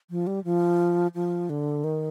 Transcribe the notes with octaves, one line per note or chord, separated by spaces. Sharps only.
F3
G3
F3
F3
D3
D#3